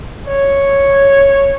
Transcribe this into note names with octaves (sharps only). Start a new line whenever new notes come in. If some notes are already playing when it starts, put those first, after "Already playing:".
C#5